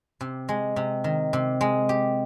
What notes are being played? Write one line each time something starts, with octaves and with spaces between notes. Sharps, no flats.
C3
G#3
C3
D#3
C3
G#3
G4